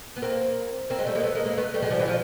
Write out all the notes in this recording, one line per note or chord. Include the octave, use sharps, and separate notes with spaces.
B3
A#3 C4
A#3 C4
F#3 G#3
G3 A3
G#3 A#3
A3 B3
G#3 A#3
G#3 A#3
A3 B3
G3 A3
F#3 G#3
F3 G3
E3 F#3
F3 G3